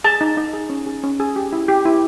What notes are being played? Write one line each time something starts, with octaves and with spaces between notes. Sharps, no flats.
G#4 A5
D#4
D#4
G#4
C#4
G#4
C#4
G#4
G4
E4
G4
E4